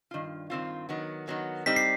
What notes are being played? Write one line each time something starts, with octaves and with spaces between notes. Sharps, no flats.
G2 D#3 F4
G2 D#3 G3 C4 F4
D#3 F#3 B3
D#3 F#3 B3
G3 C4 D#4 B6
C7